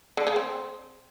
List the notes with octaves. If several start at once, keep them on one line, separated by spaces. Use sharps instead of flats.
D3
C#3
C4